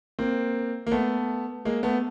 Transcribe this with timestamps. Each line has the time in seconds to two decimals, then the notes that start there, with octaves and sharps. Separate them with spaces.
0.19 A#3 C4
0.87 A#3
0.91 A3 B3
1.65 G#3 A#3
1.83 A3 B3